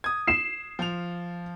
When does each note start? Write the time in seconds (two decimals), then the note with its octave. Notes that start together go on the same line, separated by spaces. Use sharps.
0.04 D#6 G#6
0.27 C7 E7
0.79 F3 F7